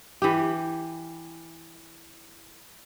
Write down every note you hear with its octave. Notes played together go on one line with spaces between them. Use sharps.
E3 G4